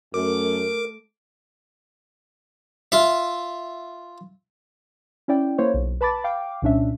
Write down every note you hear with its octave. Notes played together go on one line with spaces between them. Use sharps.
F#2 A3 A#4 D6
F4 E5
C#4 E4 D5 G5
A#3 E4 C5 C#5
B1
B4 A5 B5 D6 A6
F5 G5 D6
C2 A#2 C#4 D4 E5